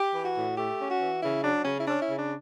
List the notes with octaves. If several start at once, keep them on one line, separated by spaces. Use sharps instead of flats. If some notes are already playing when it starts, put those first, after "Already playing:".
Already playing: G4
E3
F#4
A2
A3 G4
C#4
F#4
E3
C#3 E4
F#3 D4
C#3 C#4
E4
C#4 D4
E4
C#3
D4